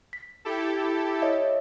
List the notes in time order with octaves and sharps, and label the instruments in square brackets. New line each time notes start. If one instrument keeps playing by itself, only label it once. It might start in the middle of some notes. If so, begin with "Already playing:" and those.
[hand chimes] B6
[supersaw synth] E4 G4 A4
[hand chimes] C#5 D#5 E5